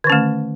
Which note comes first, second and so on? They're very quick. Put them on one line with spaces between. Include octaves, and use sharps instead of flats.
D3 D#3 C#4 A3